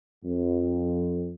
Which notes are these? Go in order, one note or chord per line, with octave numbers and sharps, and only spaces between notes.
F2